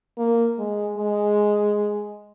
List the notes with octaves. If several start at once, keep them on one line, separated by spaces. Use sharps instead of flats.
A#3
G#3
G#3